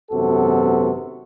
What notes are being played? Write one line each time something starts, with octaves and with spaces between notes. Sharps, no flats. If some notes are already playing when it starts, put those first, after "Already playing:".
G#1 F#2 C3 B3 F#4 A4